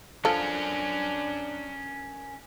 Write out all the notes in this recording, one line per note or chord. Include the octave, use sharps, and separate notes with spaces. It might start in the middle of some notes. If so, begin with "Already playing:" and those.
F3 C#4 D4 A4 A#4